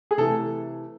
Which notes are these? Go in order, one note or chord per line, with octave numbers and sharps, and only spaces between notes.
G#4
C3 E3 A3 A4